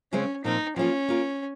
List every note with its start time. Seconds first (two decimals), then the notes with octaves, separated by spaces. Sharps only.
0.12 C#3 G#3 C4 C#4
0.44 A#2 F3 C4 D#4
0.76 F3 A#3 C#4 F4
1.08 A#3 F4 A#4